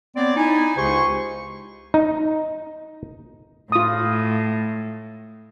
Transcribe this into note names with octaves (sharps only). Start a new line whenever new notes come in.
B3 C4 C#5 D5
D#4 E4 G#5
C#2 C#3 G4 C5 C6 C#6
D#4
A2 F4 D#6